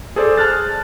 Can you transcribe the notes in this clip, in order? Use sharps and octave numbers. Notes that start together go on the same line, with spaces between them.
G#4 A4 C5 D5
A5 F6 F#6 A6